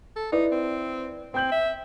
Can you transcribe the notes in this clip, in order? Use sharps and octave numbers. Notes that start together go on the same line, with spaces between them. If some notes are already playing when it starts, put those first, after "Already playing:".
A4
D#4 E4 B4 D5
C4
C4 G5 G6 F#7
E5